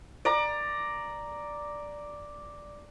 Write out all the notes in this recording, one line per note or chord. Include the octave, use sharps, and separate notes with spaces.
D5 A#5